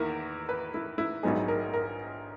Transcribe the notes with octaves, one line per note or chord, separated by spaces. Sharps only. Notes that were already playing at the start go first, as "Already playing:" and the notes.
Already playing: E2 D#3 A#3 E4 A#4
B4
E4
E4
A#1 G#2 F#3 B3 D#4 G#4
A#4
A#4